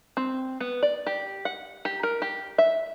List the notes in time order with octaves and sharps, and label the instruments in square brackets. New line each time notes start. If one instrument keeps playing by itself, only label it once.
[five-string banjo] C4
B3
D5
G4
F#5
G4
A#4
G4
E5